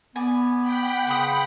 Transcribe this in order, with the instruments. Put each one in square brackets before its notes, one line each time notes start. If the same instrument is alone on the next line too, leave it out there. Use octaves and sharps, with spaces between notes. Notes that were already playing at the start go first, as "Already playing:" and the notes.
[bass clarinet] B3 [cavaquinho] D5 G#5
[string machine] F#5 G5 B5
[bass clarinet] C#3 [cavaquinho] B4 C6 D#6